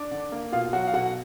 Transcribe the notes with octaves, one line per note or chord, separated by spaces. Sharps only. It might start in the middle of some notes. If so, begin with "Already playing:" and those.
Already playing: D4 D5
D3
A#3
B2 F4 F5
F#3 F#4 F#5
F5
B2 F#4 F#5